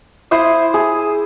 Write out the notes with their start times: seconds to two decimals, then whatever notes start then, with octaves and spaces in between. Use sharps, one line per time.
0.31 E4 C5 C6 D#6
0.74 G#4